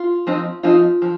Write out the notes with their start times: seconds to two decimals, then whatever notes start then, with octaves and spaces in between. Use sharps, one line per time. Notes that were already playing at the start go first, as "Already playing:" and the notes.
Already playing: F4
0.27 F3 C4 D#4
0.63 F3 C4 D#4 F4
1.02 F3